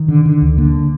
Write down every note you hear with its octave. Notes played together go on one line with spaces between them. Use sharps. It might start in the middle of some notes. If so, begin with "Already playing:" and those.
Already playing: D#3
D3
D3
D2
D3 A#3